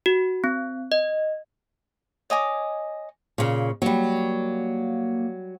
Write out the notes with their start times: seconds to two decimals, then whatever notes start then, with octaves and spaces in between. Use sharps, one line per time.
0.06 F#4
0.44 C4
0.92 D#5
2.30 C#5 D#5 G#5 D6
3.38 A#2 C#3
3.82 F#3 G3 A#3